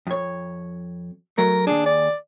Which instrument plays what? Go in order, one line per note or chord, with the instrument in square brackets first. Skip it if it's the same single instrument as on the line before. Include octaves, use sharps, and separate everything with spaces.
[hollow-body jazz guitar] F2 C#5
[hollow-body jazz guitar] F#3 A3 [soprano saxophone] A#4
[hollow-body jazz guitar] D#2 G#4 [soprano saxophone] D4
[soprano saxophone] D5